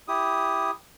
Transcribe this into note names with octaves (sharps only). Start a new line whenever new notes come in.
E4 G4 D#6